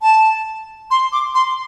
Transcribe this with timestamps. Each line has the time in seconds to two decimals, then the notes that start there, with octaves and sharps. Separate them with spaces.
0.02 A5
0.91 C6
1.12 D6
1.35 C6